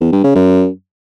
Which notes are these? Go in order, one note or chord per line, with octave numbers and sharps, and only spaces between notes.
E2
G2
C#3
F#2